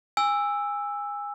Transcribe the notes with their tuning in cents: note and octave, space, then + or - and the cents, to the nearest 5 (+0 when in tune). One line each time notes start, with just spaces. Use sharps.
G#5 -25 E6 +0